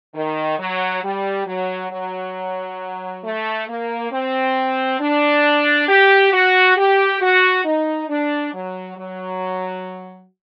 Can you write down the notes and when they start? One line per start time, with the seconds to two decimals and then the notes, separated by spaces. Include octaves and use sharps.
0.14 D#3
0.58 F#3
1.03 G3
1.46 F#3
1.91 F#3
3.24 A3
3.68 A#3
4.12 C4
5.00 D4
5.88 G4
6.33 F#4
6.77 G4
7.21 F#4
7.65 D#4
8.09 D4
8.54 F#3
8.97 F#3